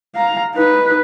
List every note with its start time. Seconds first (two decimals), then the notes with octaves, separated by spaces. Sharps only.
0.15 F5 A#5
0.55 D#4 B4